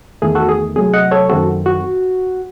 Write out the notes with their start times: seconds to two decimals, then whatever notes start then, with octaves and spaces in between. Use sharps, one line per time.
0.22 E2 D#3 A3 G#4
0.35 F#4 A4
0.49 G#4
0.76 C3 F#3 A3 G#4
0.94 D#5 F#5
1.11 A4 C#5
1.29 F#2 D#3 A3 C4 F#4 A4
1.66 F#4